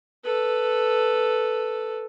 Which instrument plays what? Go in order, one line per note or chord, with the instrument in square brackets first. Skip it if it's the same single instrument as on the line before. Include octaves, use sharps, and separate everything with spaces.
[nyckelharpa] A4 B4